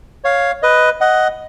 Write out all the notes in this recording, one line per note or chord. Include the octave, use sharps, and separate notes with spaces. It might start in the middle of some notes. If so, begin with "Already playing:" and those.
C#5 F5
B4 D#5
D#5 F#5